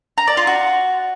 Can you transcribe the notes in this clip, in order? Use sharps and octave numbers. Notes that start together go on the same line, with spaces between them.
A#5
D5
F4
F#4